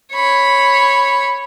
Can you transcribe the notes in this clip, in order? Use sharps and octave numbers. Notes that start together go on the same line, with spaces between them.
C#5 B5